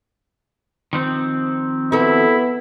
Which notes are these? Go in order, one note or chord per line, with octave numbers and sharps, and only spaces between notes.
D#3 F3 C4
B3 E4 F#4 A4